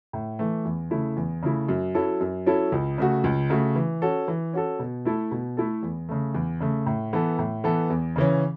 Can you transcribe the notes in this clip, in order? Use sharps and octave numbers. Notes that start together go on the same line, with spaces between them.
A2
E3 A3
E2
C#3 A3 E4
E2
C#3 A3 E4
F#2
F#3 C#4 E4 A4
F#2
F#3 C#4 E4 A4
C#2
C#3 A3 F#4
C#2
C#3 A3 F#4
E3
C#4 F#4 A4
E3
C#4 F#4 A4
B2
A3 E4 A4
B2
A3 E4 A4
E2
C#3 A3
E2
C#3 A3
A2
E3 B3 A4
A2
E3 B3 A4
E2
C#3 E3 C#4